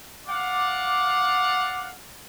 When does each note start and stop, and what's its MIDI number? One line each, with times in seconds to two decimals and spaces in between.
0.27 1.88 74
0.27 1.88 77
0.27 1.88 78
0.27 1.80 86